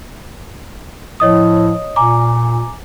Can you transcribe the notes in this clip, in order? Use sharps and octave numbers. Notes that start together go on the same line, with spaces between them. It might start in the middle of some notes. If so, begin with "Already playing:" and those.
A2 F3 C#5 D#5 D#6
A#2 G#5 A#5 D6